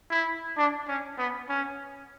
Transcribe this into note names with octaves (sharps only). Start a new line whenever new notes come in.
E4
D4
C#4
B3
C#4